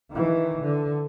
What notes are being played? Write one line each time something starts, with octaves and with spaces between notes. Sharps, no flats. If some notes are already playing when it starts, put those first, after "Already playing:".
D#3 E3
D3